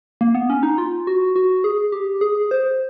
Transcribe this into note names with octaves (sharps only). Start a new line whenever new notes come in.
A#3
B3
C#4
D#4
F4
F#4
F#4
G#4
G4
G#4
C5